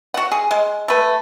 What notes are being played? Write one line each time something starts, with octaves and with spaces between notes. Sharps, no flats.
F#4 F#5
G#4
G#3
A3 B4